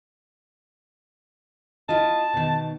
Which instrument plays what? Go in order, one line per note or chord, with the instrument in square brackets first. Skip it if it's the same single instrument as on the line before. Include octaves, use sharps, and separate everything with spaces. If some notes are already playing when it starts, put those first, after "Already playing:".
[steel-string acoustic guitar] E4 F4 D#5 [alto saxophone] A5
[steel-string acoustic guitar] B2 D#3